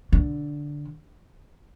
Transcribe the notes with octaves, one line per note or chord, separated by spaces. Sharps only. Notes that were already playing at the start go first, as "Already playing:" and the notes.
D3